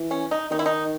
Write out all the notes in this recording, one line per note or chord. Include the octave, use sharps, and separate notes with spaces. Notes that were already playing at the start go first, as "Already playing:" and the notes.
Already playing: E3
C#4
D#4
D#3 D#4
E4
D#4